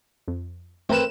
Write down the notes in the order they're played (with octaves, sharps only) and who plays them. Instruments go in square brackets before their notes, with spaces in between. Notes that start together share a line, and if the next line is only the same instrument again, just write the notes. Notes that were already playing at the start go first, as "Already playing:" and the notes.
[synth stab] F2
[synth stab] A3 A#4 E7 [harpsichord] C4 B4